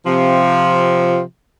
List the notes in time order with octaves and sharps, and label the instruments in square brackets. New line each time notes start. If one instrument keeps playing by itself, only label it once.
[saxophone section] C3 F3